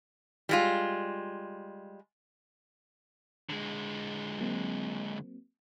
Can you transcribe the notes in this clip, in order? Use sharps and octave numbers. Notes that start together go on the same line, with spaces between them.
G3 G#3 F4
D3 G#3
F#3 A#3 C4